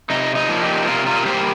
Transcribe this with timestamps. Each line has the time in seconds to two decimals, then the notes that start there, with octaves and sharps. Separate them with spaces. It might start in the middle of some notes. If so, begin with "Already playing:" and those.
0.10 C3 D#4
0.35 D#4
0.49 F3 A#3
0.61 D#4 G4
0.87 C3 F4 A#4
1.06 F4 A#4
1.25 G3 A#3 G4 C5